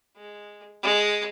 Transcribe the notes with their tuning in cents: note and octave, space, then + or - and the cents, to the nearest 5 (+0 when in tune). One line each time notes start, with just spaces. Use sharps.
G#3 -5
G#3 +0